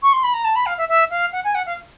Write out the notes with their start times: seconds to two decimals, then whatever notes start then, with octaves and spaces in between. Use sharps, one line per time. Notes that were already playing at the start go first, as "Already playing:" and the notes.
0.02 C#6
0.13 C6
0.23 B5
0.34 A#5
0.44 A5
0.55 B5
0.66 F5
0.78 E5
0.89 E5
1.10 F5
1.32 F#5
1.44 G#5
1.55 F#5
1.66 F5